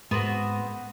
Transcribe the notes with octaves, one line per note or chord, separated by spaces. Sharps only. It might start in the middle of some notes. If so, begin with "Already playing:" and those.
G#2 B3 C4 F#4